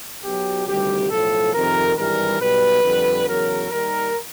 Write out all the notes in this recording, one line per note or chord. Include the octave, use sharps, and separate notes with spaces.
B1 B2 F#3 G4
D2 C3 D#3 G3 G4
B1 A2 F3 A4
F2 C3 D#3 A#4
G#1 G2 E3 G3 A#4
B1 B2 G3 B4
F2 D3 G3
E2 C#3 F#3 A#4
D#2 D#3 G3 A#4